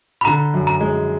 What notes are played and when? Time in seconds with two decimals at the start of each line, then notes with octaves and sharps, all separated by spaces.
0.21 B5
0.25 D3 A#5
0.54 F#2
0.67 A#5
0.81 G#3